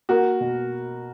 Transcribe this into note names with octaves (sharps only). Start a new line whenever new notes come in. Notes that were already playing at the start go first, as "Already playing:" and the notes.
A#3 F#4 A#4
B2